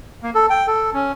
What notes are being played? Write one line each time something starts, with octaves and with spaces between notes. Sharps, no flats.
A#3
A4
G5
A4
C#4